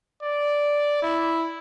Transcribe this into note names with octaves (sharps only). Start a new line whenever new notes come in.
D5
E4